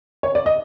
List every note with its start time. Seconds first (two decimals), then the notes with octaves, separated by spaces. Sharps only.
0.23 C#5
0.35 D5
0.46 D#5